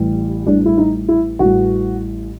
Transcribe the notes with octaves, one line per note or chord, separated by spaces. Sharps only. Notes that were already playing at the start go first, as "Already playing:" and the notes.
Already playing: A1 A2 E3 G3
A1 A2 E3 G3 D4
E4
D#4
E4
A1 A2 E3 G3 F#4